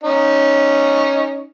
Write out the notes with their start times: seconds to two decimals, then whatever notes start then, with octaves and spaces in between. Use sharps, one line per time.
0.04 C#4 D#4